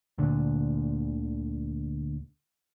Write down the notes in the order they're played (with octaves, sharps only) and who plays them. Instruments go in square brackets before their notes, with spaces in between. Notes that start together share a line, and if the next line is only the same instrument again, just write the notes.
[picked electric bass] D2 A#2 D3